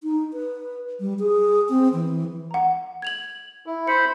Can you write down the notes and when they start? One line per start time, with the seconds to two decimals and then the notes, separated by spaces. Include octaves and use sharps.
0.03 D#4
0.33 B4
1.00 G3
1.19 G#4
1.69 C4
1.93 E3
2.51 F#5 A#5
3.02 G#6 F7 F#7
3.66 E4
3.88 C5 B5 C#7